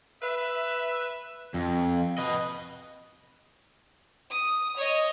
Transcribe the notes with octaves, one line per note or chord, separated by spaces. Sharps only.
B4 E5
F2
B4 D#5
D#6
C#5 D#5